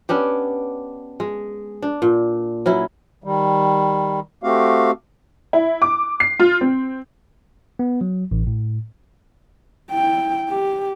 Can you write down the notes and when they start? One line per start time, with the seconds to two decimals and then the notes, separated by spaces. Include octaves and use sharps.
0.09 B3 C#4 D4 G4
1.20 G#3
1.82 D4
2.02 A#2
2.66 F#3 C#4 E4
3.24 D#3 G3
4.43 A3 C4 F#4 G4 F5
5.53 E4
5.82 D6
6.20 C7
6.40 F4
6.61 C4
7.79 B3
8.01 F#3
8.31 A1
8.47 A2
9.91 E4 G5
10.50 G4